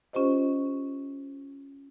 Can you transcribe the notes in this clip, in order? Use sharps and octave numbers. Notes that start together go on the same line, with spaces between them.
C#4 F4 G4 C5 D#5